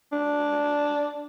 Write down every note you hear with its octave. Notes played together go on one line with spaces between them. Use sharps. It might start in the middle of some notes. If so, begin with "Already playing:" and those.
D4